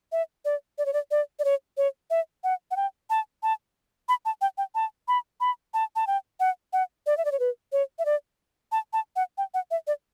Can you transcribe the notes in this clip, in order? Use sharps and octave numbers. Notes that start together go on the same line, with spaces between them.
E5
D5
D5
C#5
D5
D5
D5
C#5
C#5
E5
F#5
F#5
G5
A5
A5
B5
A5
G5
G5
A5
B5
B5
A5
A5
G5
F#5
F#5
D5
E5
D5
C#5
B4
C#5
E5
D5
A5
A5
F#5
G5
F#5
E5
D5